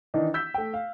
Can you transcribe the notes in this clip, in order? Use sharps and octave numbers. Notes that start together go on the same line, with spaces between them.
D#3 E3 D4 D#4
E6 G6 B6
A3 G5
F5